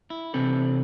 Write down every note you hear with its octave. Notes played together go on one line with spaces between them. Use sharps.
E4
C3 E3 C4 A4 B4